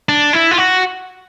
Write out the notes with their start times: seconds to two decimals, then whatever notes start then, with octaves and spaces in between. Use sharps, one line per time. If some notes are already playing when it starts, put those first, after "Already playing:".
0.09 D4
0.33 E4
0.51 F4
0.58 F#4